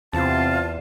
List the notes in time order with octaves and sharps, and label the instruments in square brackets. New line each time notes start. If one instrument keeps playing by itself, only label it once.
[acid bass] E2 [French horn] C3 [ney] F4 [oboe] A5